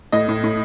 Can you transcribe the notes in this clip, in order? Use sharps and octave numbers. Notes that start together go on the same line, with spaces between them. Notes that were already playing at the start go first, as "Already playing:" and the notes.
A2 D#5
A2
A2